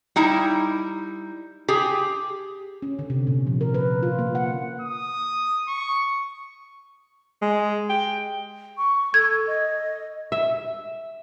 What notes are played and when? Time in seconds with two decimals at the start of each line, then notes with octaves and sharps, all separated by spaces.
0.16 G3 D#4 E4
1.68 G4 G#4
2.82 C#4
2.99 D3
3.10 C3
3.27 A#2
3.47 F3
3.61 A#4
3.74 B4
4.03 F4
4.19 A#3
4.35 F#5
4.81 D#6
5.68 C#6
7.42 G#3
7.89 G5
8.78 C#6
9.14 A4 G#6
9.47 D#5
10.32 E5